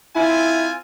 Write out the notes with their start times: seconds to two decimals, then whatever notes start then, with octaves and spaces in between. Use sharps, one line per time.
0.16 C4 E4 F4 G#5